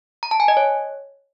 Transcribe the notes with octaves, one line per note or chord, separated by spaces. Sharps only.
A#5
A5
G#5
D#5
C#5